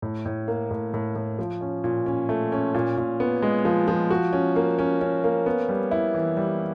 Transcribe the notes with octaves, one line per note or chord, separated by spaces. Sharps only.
A2
A2
A#3
A2
A2
A2
F3
C#4
A#2
C#4
A3
C#4
A#2
A#2
B3
G#3
F3
F3
F#4
C#4
A#3
C#4
C#4
A#3
B3
G3
E4
E3
G3